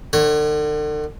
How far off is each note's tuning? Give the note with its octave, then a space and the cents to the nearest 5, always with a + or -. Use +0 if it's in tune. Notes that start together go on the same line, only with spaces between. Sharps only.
D3 +40 C#5 -25